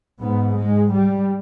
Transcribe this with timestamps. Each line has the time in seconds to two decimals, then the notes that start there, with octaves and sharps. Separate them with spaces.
0.20 G#2 B3
0.57 G#3
0.92 G3